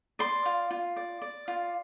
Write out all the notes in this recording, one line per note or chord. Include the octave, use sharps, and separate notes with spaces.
D5 C6
F4
F4
D5
D5
F4